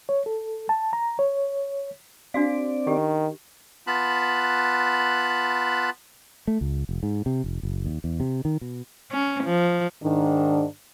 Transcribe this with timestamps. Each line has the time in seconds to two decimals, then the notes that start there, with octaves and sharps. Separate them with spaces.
0.09 C#5
0.26 A4
0.69 A5
0.93 A#5
1.19 C#5
2.34 C4 D4 F#4 D5 F5
2.87 D#3 G4
3.87 B3 F4 A5 B5 F#6
6.47 A3
6.61 C#2
6.89 F1
7.03 G#2
7.26 C3
7.44 F1
7.63 F#1
7.86 D#2
8.04 E2
8.20 C3
8.45 D#3
8.61 B2
9.11 C#4
9.44 F3
10.03 G#2 D#3 D4